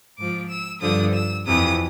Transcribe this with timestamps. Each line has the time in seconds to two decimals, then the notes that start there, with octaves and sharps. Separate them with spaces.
0.18 G#2 F3 D6
0.50 E6
0.82 G2 D3 F3 D#6
1.14 E6
1.46 F2 C3 E3 D#6